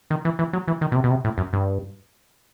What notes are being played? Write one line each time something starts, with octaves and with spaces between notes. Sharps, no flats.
D#3
E3
E3
F#3
E3
D#3
B2
C3
B2
C3
A2
F#2
G2